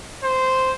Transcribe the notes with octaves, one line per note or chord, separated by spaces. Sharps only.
C5